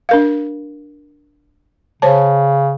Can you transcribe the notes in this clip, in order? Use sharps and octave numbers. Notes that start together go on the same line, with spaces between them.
D4 A#4 F5
C#3 C5 C#5 A5